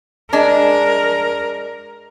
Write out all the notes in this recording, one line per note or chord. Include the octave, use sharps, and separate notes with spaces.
G#3 D4 A#4